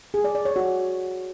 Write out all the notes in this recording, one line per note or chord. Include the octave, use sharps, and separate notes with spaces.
G#4
D5
D5
C#5
F#4